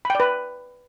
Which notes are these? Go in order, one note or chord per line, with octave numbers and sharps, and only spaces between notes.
B4 D5 G5 B5